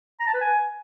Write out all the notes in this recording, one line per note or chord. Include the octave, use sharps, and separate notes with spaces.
A#5
A5
B4
G#5